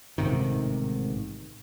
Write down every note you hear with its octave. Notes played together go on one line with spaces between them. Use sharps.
A1 G#2 C3 D#3